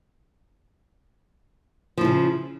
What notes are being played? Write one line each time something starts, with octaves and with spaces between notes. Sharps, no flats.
C#3 F3 E4